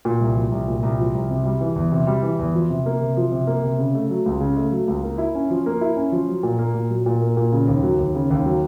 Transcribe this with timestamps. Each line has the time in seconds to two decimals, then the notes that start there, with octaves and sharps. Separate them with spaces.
0.05 A#2
0.20 C2
0.36 F3
0.52 C2
0.68 A#2
0.83 C2
0.99 F3
1.14 C2
1.30 C3
1.45 G3
1.61 E3
1.76 E2
1.92 C3
2.07 G3
2.23 E3
2.39 E2
2.55 F3
2.70 C3
2.86 A#3
3.01 C3
3.17 F3
3.32 C3
3.47 A#3
3.64 C3
3.79 C#3
3.95 A3
4.10 F#3
4.26 C#2
4.40 C#3
4.57 A3
4.72 F#3
4.88 C#2
5.04 A#3
5.18 E4
5.35 C#4
5.50 F3
5.66 A#3
5.81 E4
5.96 C#4
6.12 F3
6.28 F#3
6.43 A#2
6.58 A#3
6.74 A#2
6.91 F#3
7.06 A#2
7.21 A#3
7.37 A#2
7.52 C#3
7.67 D#2
7.83 F#3
7.99 D#2
8.15 C#3
8.31 D#2
8.45 F#3